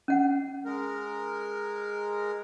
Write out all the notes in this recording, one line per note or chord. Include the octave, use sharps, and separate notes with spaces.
C#4 F#5
G#3 A#4